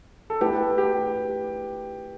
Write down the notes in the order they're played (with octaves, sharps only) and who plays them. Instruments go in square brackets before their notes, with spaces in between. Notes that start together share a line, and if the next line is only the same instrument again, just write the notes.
[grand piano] A4
[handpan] A3 E4 B4 [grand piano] G4
[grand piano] G4